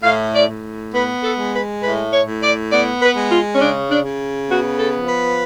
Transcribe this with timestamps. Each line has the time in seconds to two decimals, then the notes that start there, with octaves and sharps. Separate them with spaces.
0.03 A2 F5
0.33 D5
0.48 A2
0.93 B3 B4
1.22 A4
1.37 G#3
1.52 B4
1.82 A2 B4
2.11 C#5
2.26 A2
2.40 D5
2.70 B3 D5
3.01 B4
3.15 G#3
3.29 F4
3.54 C#4
3.59 C#3 D4
3.89 D4
4.03 C#3
4.48 B3 F#4
4.78 A4
4.94 F3
5.07 B4